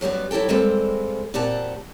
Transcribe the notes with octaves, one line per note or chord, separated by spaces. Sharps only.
F#2 F#3 G3 B3
F#3 E4 G4 A4 G5
G3 G#3 A#3 C4 A4
A#2 C4 G4 D5 F#5 A5